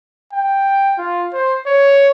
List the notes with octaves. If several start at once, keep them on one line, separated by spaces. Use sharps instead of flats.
G5
F4
C5
C#5